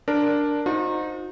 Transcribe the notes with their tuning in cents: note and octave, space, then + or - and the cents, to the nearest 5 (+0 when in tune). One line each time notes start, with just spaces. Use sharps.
D4 +0 A#4 +0
D#4 +0 F#4 -45 C5 +0